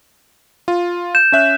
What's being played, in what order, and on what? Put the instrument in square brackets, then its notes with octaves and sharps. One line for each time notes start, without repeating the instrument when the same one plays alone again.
[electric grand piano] F4
[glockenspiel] G6 E7
[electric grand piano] C#4 E5 F#6